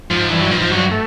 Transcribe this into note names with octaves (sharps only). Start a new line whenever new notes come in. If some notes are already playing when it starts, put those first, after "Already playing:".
G#2 F3
G2 E3
F#3
G#2 F3
F3
G2 F#3
A3